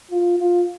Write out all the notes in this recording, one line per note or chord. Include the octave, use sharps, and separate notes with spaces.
F4
F4